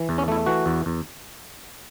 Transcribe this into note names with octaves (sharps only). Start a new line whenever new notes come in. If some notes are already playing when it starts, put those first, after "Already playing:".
Already playing: E3
E2
C#4
A3 E4
E3 F#4
E2
E2